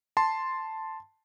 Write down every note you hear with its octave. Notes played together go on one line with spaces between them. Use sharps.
A5 C6